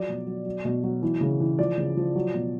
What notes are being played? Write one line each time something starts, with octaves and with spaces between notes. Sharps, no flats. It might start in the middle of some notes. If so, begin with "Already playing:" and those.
Already playing: F3 F#3 D5
B2
F#3
F#3
B2
F#3
E3
C#3
E3
F3 D5
C#3
F3
F#3
B2